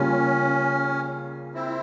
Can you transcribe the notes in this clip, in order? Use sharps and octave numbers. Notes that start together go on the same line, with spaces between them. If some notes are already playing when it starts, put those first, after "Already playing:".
Already playing: C#3 G3 A#3 C#4 F4
C4 E4